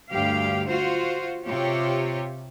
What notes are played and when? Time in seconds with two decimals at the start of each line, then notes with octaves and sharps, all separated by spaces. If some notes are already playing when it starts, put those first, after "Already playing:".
0.11 D2 G2 G4 F5
0.68 F4 F#4 C5
1.45 C3 F4 G4 C#5